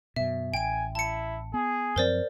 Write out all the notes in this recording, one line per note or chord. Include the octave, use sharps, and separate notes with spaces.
F#2 B2 E5
A1 G5 G#5 D7
E4 A5 C#7
B3 G#4
F#2 F3 C4 A#4 C5 D5